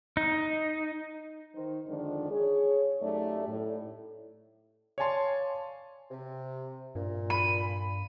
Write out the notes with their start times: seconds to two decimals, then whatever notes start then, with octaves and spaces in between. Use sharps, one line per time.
0.17 D#4
1.56 D#3 C5
1.87 F2 D3 D#3 F3 G#3 D4
2.31 G#4 C#5
3.02 F#2 A3 D#4 G4 D5
3.47 A2
4.98 C#5 D5 F5 G#5 A5 C6
6.11 C3
6.95 G2 A#2
7.30 B5 D#7